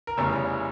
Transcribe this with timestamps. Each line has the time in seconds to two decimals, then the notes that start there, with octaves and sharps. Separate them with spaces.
0.07 A#4
0.17 F1 E2 C#3 G3 C#5